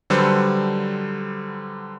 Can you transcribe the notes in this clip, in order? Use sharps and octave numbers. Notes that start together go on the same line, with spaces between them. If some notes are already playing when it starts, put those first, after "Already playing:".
D3 F#3 G3 A4 B4 C5